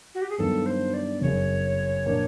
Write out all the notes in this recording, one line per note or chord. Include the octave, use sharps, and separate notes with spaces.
F#4
G4
G#4
G2 D#3 F#3 B3 D4 A4
C5
D5
F#1 F#2 C#3 C#5
A#2 F3 A#3 D4